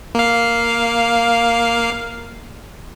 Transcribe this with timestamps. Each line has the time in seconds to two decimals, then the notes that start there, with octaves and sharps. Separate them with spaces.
0.15 A#3 F5